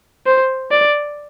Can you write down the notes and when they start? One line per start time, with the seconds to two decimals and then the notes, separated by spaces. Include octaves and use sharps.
0.26 C5
0.71 D5